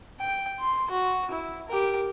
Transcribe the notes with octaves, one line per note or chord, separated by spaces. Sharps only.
G5
C6
F#4
E4
G4 A#4